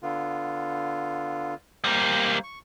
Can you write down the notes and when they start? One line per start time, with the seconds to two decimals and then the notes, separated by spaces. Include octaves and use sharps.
0.03 D3 B3 F4
1.84 G3 A#3 C5
2.43 C#6